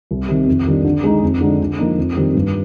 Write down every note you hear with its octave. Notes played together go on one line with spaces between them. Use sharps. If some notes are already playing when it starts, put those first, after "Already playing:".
C2
C3 D#3
F2
D#3 G3 D4
D3
G#3 D#4
F2
D3 G#3 C4 D#4
D3
F3 A#3 D#4
F2
D#3 G3 C4
G2